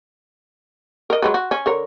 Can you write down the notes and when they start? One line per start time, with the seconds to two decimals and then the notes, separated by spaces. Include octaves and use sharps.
1.10 A#4 D#5
1.22 F#3 G#3 B4
1.34 F#4
1.51 C#4
1.66 D3 A#4 C#5